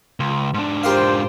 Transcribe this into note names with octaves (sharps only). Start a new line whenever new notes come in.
C#2
G#2 D4
F4 G4 A#4 C5 F5 G5